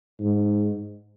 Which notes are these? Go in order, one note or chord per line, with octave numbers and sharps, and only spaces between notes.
G#2